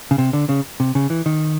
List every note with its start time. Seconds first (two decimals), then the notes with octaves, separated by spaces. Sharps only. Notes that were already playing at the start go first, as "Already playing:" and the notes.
0.11 C#3
0.18 C3
0.33 D3
0.49 C#3
0.80 C3
0.95 C#3
1.10 E3
1.26 D#3